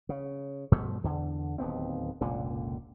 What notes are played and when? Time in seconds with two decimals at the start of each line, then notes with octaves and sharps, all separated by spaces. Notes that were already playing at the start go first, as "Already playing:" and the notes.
0.09 C#3
0.72 G2 B2 F3 A3
1.04 E2 D3
1.58 D1 D#2 B3 C4
2.21 F1 C#2 A#2 D3